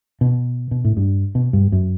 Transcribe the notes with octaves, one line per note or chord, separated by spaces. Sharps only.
B2
B2
A2
G2
B2
G2
F#2